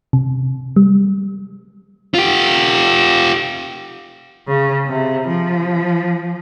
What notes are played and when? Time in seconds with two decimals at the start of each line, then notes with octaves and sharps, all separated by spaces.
0.13 C3
0.76 G3
2.14 F4 G4
4.47 C#3
4.87 C3
5.28 F3